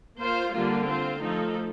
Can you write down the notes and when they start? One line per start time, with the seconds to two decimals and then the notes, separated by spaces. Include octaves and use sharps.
0.18 A#3 F4 C5
0.52 D3 G3 A#3 F4
0.86 C4 F4 C5
1.21 F3 A3 D#4 A4